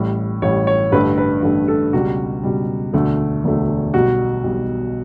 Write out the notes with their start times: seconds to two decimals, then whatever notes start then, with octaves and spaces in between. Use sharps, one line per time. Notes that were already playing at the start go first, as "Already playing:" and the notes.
Already playing: A1 A2 G3
0.42 A1 A2 G3 C#5
0.67 C#5
0.92 A1 G2 D3 A3 B4
1.18 B4
1.43 A1 G2 D3 A3
1.68 A4
1.93 C#2 B2 G3 F#4
2.43 C#2 B2 G3
2.93 E1 D2 D3 A3
3.44 E1 D2 D3 A3
3.94 B1 B2 G3 F#4
4.44 B1 B2 G3